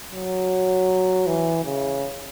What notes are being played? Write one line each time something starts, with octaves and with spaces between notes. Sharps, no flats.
F#3
E3
C#3